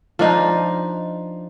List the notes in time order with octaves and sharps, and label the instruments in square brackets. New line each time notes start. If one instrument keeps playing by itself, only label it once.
[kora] F3 D4 D#4